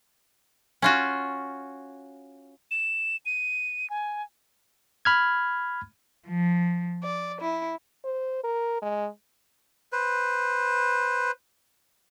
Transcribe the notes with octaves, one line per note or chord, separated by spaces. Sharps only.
C#4 F4 F#4
E7
D#7
G#5
B5 F6 G#6
F3
D5
E4
C5
A#4
G#3
B4 C5